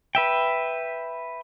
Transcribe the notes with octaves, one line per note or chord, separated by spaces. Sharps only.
B4 E5 G5